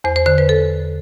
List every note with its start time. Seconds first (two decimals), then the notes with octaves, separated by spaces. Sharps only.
0.04 E2 C5
0.16 C5
0.26 D3 C5
0.38 B4
0.49 A4